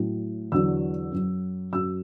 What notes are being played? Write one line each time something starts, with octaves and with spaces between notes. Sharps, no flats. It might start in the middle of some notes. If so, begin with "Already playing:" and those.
Already playing: A2 F#3
E2 D3 F#3 E6
F#2 F#3
F#2 F#3 E6